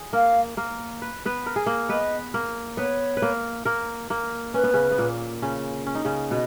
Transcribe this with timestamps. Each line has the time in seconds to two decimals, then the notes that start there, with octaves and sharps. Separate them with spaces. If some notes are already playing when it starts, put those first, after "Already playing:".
Already playing: G#4
0.13 A#3 A#4 F5
0.57 A#3 A#4
1.02 B4
1.26 B3 B4
1.46 A#4
1.56 G#4
1.66 A#3 A#4
1.89 B3 B4 D#5
2.34 A#3 A#4
2.77 B3 B4 C#5
3.17 B4
3.22 A#3 A#4
3.65 A#3 A#4
4.10 A#3 A#4
4.54 C#4 B4
4.64 B3
4.73 C#3 C#4
4.91 B3
4.98 A#2 A#3
5.42 C#3 C#4
5.86 C#4
5.95 D#4
6.05 C#3 C#4
6.30 B2 B3 D#5